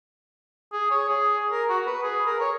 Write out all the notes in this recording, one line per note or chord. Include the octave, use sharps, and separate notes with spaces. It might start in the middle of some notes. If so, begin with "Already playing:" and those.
G#4
C#5
G#4
A#4
F#4
B4
G#4
A#4
C#5